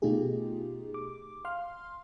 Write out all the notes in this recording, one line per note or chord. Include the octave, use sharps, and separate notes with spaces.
B2 A3 D#4 F4 G4 G#4
D6
F5 C6 F6